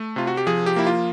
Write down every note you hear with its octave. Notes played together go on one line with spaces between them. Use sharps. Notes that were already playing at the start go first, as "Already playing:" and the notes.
Already playing: A3
C3 F4
F#4
G4
F3 G#4
G4
A#3 E4
F4